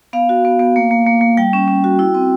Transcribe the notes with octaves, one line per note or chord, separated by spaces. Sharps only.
B3 F5
F#4
B3
B3
A#3
A#3
A#3
A#3
G3 G5
C#4
C#4
F#4
E4
C4